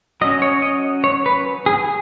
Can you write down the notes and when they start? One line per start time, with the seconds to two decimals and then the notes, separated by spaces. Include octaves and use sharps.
0.21 F#3 D#5
0.25 C#4
0.42 C#5
0.62 D#5
1.04 C#5
1.26 B4
1.66 G#4